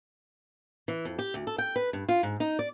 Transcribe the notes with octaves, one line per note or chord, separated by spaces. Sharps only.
E3
F2
G4
D2
A4
G5
B4
G2
F4
G#2
D#4
D5